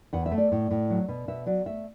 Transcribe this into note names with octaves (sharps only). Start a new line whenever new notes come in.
E2 F#5
E5
A3
D5
A2
A2
F#3
B2
B2 E5
F#3 D5
A3 E5